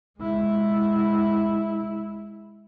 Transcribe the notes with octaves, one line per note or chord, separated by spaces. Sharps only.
G#3 E4